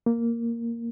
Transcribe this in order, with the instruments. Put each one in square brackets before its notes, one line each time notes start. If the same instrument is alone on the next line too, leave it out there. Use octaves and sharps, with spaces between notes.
[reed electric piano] A#3